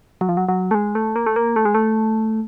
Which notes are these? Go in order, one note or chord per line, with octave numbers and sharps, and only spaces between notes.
F#3
F3
F#3
F#3
A3
G#3
A3
A#3
A3
A#3
A3
G#3
A3